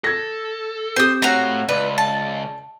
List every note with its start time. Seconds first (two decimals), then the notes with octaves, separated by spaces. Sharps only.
0.04 A4 G#6 A#6
0.96 C4 G4 C5 D#6
1.22 A3 F#4 C#5 F5 A#5
1.69 C#2 B4 D5
1.98 A5